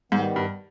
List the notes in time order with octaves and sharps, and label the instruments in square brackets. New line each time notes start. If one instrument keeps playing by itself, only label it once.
[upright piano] G#2 [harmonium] D#3 G3 B3
[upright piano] G2